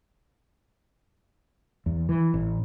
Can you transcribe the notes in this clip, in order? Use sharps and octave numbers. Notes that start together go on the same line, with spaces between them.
E2
E3
A1